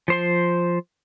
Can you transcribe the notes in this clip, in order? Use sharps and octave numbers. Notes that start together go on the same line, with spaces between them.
F3 C5 C6